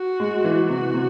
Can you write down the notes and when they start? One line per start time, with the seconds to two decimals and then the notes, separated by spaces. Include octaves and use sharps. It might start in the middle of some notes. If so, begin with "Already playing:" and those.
Already playing: F#4
0.20 G#3
0.44 E3
0.69 C3 F#4
0.94 C3